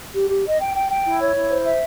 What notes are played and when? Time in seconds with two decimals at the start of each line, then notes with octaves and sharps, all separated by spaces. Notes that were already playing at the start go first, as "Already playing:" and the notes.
0.15 G4
0.29 G4
0.45 D#5
0.60 G5
0.75 G5
0.90 G5
1.05 E4
1.20 C#5
1.34 E4
1.49 C5
1.65 E5